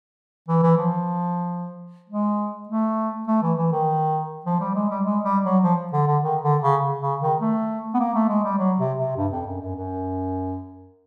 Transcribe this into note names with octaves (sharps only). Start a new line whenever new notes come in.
E3
E3
F3
G#3
A3
A3
E3
E3
D#3
F3
G3
G#3
G3
G#3
G3
F#3
F3
D3
D3
D#3
D3
C#3
C#3
D#3
A3
B3
A#3
A3
G#3
G3
F#3
C3
C3
G2
F2
F#2
F#2
F#2